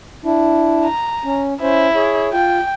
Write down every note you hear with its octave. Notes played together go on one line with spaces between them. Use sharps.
D4 E4
A#5
C#4
C#4 E4 C5
G#4 C#5
F4 G5